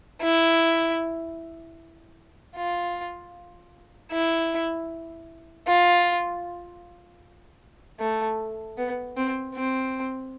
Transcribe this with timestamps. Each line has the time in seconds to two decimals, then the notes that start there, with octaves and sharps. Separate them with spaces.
0.22 E4
2.56 F4
4.11 E4
5.67 F4
8.00 A3
8.77 B3
9.17 C4
9.55 C4